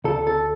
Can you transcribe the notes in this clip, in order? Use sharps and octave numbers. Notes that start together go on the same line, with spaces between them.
D2 A4
A4